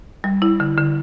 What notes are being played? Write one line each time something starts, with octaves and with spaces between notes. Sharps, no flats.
G3
E4
D3
D3